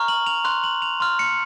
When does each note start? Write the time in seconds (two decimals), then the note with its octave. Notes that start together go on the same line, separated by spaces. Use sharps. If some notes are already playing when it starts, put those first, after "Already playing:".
Already playing: A#5 C#6 F6
0.08 F#7
0.26 F7
0.44 C6 F#6 F7
0.64 F#7
0.82 F7
1.00 C6 F6
1.19 C#7